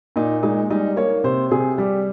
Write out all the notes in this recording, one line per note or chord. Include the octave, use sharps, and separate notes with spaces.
A#2 D#4
G#3 D#4
G3 D#4
A#3 C#5
C3 C5
C3 G#4
G3 G4